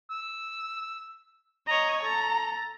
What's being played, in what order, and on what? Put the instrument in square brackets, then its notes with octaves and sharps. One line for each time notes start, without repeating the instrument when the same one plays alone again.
[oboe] E6
[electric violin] C#5 D#5 [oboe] A#5
[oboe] A4 [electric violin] A#5